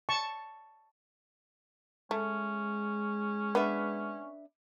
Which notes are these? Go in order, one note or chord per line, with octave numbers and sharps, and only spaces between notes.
A5 C#6
G#3 A3 C#4
B3 D4 B4 E5